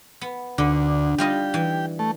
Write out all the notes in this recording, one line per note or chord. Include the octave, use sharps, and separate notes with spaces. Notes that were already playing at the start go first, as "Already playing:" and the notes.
B3
D2 D3
G3 F4 G4 D#5
E3
A3